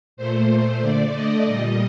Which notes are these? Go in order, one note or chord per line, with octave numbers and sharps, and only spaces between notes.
A#2 A3 C5
D3 A3 D5
D#5
A#2 G3